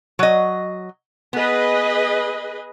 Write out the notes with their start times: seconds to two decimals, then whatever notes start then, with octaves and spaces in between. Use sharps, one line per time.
0.19 F#3 D#5
1.33 B3 G#4 B4 D#5